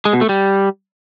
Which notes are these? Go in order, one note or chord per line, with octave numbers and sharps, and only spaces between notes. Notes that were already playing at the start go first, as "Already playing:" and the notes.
G#3
B2
A3
G3